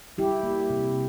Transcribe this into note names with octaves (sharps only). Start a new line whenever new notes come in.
G3 E4 G4
A#3
C3